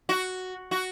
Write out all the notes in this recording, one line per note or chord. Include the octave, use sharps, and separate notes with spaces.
F#4
F#4